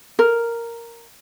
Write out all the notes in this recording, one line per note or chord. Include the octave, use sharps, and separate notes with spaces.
A#4